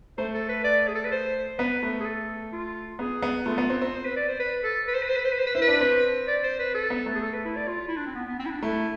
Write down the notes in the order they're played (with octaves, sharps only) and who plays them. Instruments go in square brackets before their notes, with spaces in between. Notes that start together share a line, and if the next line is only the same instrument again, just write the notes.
[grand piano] A3 [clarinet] C5
[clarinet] A4
B4
D5
G#4
A4
B4
C5
[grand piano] B3 [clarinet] B4
[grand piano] A3
[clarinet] G#4
A4
F4
[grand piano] B3 [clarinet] G#4
[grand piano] B3
[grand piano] A3 [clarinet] F4
[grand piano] B3
C4
C4
[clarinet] C5
B4
D5
C5
B4
A4
B4
C5
B4
C5
B4
C5
B4
C5
B4
[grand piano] E4 [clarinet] C5
[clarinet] B4
[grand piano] D4
C4
[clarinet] D5
C5
B4
A4
[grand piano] B3
A3
[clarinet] G#4
A4
B4
E4
D5
F4
E4
D4
C4
B3
B3
C4
E4
D4
[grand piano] A3 [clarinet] E4